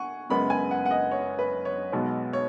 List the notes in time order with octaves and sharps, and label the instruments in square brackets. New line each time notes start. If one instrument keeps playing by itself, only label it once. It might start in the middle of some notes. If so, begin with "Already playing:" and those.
Already playing: [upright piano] F#5 G#5 C#6
F#1 F#2 C#3 G#3 B3 B5
G#5
F#5
F#5
D#5
C#5
B4
C#5
B1 B2 G#3 B3
C#5